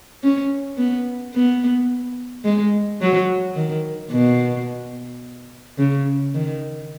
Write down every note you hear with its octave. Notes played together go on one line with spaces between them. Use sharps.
C#4
B3
B3
G#3
F#3
D#3
B2
C#3
D#3